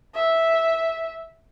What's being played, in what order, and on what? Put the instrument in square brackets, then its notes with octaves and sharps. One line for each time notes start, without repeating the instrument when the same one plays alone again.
[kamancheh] E5